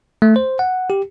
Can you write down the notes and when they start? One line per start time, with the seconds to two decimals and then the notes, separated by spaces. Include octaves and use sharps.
0.22 A3
0.36 C5
0.59 F#5
0.90 G4